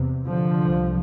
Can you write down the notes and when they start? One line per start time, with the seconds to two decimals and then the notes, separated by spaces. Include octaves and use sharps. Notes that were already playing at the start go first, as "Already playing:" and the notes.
Already playing: E2 C3
0.27 D3 F3
0.60 C2 C3